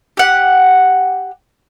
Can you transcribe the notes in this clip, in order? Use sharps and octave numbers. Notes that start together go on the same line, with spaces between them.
G4 F#5